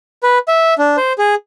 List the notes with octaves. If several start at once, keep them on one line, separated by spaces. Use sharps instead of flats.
B4
E5
D4
C5
G#4